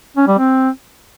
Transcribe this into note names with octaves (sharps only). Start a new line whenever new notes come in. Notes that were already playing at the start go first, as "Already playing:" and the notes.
C#4
G3
C4